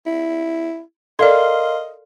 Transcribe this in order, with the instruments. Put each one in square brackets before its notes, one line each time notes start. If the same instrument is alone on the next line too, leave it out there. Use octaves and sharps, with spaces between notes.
[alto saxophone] E4
[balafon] A4 D5 [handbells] A#4 F5 C6 [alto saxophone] D#5